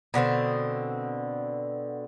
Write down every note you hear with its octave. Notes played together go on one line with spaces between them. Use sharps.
B2 D3 A3 C4